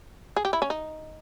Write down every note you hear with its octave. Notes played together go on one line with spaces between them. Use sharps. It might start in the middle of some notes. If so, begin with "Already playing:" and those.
G#4
G4
E4
C#4
D#4